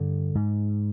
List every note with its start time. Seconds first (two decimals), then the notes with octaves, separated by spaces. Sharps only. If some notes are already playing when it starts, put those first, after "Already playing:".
Already playing: G2 D3
0.35 G#2